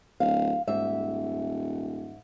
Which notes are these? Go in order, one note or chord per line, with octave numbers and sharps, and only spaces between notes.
D1 F5
D#1 G#2 E5